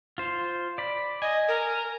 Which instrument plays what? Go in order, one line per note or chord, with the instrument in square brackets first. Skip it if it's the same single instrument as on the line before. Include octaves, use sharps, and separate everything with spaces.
[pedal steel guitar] F4 C5
D5 B5
[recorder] D#5 [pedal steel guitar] G#5
[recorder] A#4